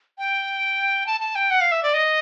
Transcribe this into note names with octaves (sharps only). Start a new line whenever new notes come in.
G5
A5
A5
G5
F#5
F5
E5
D5
D#5